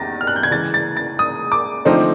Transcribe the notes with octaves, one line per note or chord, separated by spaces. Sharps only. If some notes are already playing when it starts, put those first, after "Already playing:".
Already playing: E2 C3 D#3 A6 A#6
F6
F#6
G6
G#6
C#3 E3 G#3 A6
A6
A6
D#6
D6
D3 F3 A3 C4 D#4